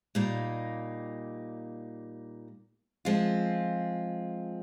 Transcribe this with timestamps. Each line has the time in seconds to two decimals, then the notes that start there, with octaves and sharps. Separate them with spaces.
0.15 A#2 G3 A#3 D#4
3.05 F3 G#3 C4 F4